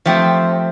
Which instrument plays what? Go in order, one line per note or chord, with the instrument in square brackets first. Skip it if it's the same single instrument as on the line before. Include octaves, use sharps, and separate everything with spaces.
[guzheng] F3 A3 C4 G4